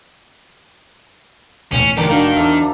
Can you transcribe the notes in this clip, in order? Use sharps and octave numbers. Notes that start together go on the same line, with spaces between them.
E1 A1 D#2 C#4
F#1 D2 D#3 E3 G4 A#4 D5 A#5
F1 D#3 A#3 D4 F#4
E2 A#4 C5 E5